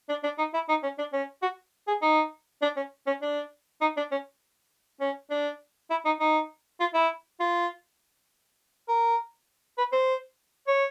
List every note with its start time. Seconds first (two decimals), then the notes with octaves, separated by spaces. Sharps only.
0.09 D4
0.24 D4
0.38 D#4
0.54 E4
0.69 D#4
0.83 C#4
0.98 D4
1.13 C#4
1.42 F#4
1.87 G#4
2.02 D#4
2.62 D4
2.76 C#4
3.07 C#4
3.22 D4
3.81 D#4
3.97 D4
4.11 C#4
5.01 C#4
5.30 D4
5.90 E4
6.05 D#4
6.20 D#4
6.80 F4
6.94 E4
7.40 F4
8.89 A#4
9.78 B4
9.92 C5
10.67 C#5